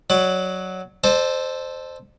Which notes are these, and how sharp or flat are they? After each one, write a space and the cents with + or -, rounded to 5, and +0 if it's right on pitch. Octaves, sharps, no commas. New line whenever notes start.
F#3 +0 D5 +25
A4 +0 C5 +0 D#5 -45